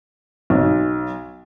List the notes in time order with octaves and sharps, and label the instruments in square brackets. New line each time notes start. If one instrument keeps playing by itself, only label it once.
[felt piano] B1